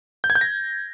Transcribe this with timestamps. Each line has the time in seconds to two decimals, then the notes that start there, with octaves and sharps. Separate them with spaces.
0.24 G6
0.30 G#6
0.35 G6
0.41 A#6